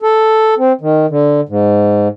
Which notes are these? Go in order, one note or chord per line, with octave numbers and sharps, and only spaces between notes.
A4
C4
D#3
D3
G#2